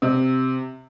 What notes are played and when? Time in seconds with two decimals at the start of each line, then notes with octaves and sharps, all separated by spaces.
0.02 C3